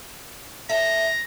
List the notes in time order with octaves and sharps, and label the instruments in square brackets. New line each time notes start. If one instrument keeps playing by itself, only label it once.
[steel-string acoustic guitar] A4 E5 [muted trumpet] A#5